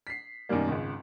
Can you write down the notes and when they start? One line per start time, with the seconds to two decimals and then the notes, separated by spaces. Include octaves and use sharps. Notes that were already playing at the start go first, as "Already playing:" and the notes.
0.07 B6 C7
0.49 F#2 B2 D#3 G3 A#3
0.68 G#1 C#2